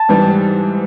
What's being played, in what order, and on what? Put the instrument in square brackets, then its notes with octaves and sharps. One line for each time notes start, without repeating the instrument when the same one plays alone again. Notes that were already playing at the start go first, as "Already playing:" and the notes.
Already playing: [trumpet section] A5
[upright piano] G#2 E3 G3